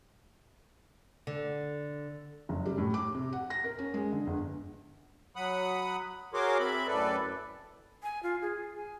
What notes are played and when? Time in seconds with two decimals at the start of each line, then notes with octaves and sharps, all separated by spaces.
1.27 D3
2.49 F#1
2.65 G3
2.78 A2
2.94 D6
3.15 C3
3.33 F#5
3.50 A#6
3.64 A#4
3.78 C#4
3.94 G#3
4.12 D3
4.27 G1
5.36 F#3 F#5 B5 D#6
6.34 F#4 G#4 A#4 C#5 C6 D6
6.59 C4 E5 B5
6.87 F#2 A2 A4 B4 D5
8.03 G#5
8.23 F4
8.42 G#4
8.76 G#5